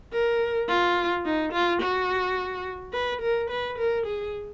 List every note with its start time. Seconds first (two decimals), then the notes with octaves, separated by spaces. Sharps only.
0.12 A#4
0.68 F4
1.25 D#4
1.53 F4
1.82 F#4
2.93 B4
3.21 A#4
3.50 B4
3.78 A#4
4.06 G#4